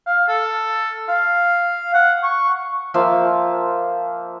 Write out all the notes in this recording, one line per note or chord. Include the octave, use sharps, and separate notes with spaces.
F5
A4
F5
F#5
C#6
F3 A#3 E5 F5